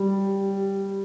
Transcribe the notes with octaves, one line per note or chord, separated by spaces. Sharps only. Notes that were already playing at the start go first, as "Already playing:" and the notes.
Already playing: G3